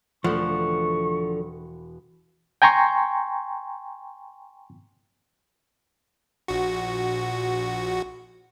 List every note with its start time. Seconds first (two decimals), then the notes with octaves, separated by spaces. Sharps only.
0.24 E1 D3 F3 A3 B3 F#5 C#6
2.62 G5 G#5 A#5 C6 C#6
6.48 A#1 F#4